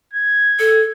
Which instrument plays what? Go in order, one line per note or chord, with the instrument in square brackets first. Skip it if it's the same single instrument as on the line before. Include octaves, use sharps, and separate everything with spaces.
[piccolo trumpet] G#6
[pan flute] A4